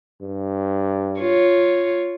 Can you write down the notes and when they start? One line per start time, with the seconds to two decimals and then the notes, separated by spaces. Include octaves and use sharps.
0.21 G2
1.19 F4 C#5